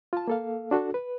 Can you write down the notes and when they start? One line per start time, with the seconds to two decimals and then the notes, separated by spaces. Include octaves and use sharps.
0.13 F4 A5
0.28 A#3 A4 F5
0.71 D4 F#4 A4
0.94 B4